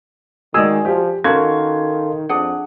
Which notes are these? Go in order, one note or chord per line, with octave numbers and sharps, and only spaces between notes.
D#3 G#3 F#4 G#4 D5 E6
F3 G4
D#3 C#4 F#4 A4 A#4 F5 C6 G#6
F2 D4 G#4 F#5